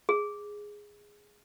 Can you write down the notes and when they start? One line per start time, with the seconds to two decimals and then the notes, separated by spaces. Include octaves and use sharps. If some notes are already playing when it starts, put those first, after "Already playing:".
0.09 G#4